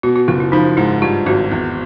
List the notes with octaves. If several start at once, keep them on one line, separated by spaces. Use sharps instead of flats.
B2 F#4
F#4
F#1 F4
E4
F3 D#4
G#2 E4
G2 F4
G#1 F#4
E2